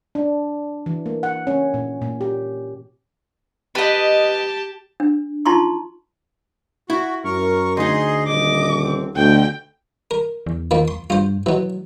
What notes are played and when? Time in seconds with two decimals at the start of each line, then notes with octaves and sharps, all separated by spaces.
0.15 D4
0.86 E3
1.06 A#3
1.23 F#5
1.47 C#4
1.74 A#2
2.02 A#2
2.21 G4
3.75 G4 B4 D#5 A5
5.00 D4
5.46 D#4 F4 A5 A#5 C6 C#6
6.90 E4 F#4
7.24 F#2 A#4 C#6
7.77 D2 D#4 G#4 D#5 C6
8.27 D#1 D#5 D6
8.82 C4
9.16 D2 B2 D3 G5
10.11 A#4
10.46 E2
10.71 D#3 F3 A#3
10.88 C6
11.10 G2 F4 C5
11.46 B2 E3 F#3